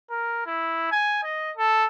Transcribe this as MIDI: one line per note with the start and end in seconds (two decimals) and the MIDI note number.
0.10 0.42 70
0.46 0.88 64
0.92 1.20 80
1.24 1.51 75
1.57 1.86 69